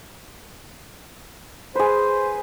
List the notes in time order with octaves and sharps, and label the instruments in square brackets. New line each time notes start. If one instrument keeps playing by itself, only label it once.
[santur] G#4 B4 [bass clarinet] C5